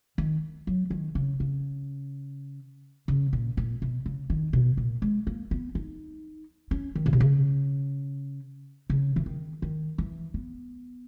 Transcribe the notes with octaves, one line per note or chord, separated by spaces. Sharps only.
D#3
F#3
D#3
C#3
C#3
C#3
A#2
A#2
B2
C#3
D#3
B2
A#2
G#3
A#3
B3
D#4
C#4
D#3
A#2
B2
C#3
C#3
E3
D#3
D#3
E3
B3